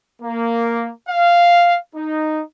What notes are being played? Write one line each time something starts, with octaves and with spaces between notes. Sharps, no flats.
A#3
F5
D#4